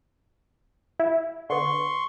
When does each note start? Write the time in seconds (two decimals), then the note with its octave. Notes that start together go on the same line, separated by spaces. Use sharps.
1.00 E4
1.50 D3 B3 C6 C#6